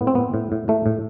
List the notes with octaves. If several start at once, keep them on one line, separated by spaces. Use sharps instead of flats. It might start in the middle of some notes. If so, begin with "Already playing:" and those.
A2 B3
C4
A2 B3
A2
A2
A2 A3
A2